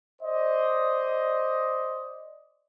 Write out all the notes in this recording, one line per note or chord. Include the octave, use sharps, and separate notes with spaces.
C5 D5 D#5